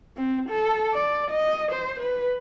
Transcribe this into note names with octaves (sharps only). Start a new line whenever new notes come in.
C4
A4
D5
D#5
C5
B4